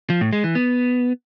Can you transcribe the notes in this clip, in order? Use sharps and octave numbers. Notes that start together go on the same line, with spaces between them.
F3
A2
G#3
E3
B3